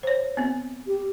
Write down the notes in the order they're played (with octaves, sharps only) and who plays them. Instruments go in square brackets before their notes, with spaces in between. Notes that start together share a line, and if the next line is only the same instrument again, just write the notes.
[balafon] C5 C#5
B3 C4
[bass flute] G4